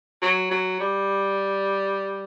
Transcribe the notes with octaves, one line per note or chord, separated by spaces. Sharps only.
F#3
F#3
G3